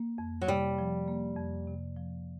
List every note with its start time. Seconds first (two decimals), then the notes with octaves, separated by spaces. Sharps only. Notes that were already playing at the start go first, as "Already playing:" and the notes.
Already playing: A#3
0.18 F2
0.42 F#3
0.48 C3 G3
0.78 F3
1.08 A#3
1.37 F2
1.67 C3
1.97 F3